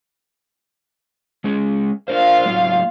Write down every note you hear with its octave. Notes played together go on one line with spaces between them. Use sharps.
G#3 C#4 G#4
D4 F4 A#4 C5 F5
F#3 A#3 D#4